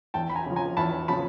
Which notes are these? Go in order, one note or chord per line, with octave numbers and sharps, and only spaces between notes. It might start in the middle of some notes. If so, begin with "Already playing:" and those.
E2 G5 A5
B5
G#5 A#5
C#3 F3
G#5 A#5
E2 A5 B5
C#3 F3 A5 B5